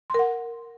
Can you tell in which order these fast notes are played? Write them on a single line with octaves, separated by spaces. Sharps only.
C6 A#4 F#5